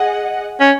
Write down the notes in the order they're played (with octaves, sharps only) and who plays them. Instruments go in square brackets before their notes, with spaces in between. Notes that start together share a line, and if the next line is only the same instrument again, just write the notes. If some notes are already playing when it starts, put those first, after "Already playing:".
Already playing: [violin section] G#4 D#5 F#5
[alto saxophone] C#4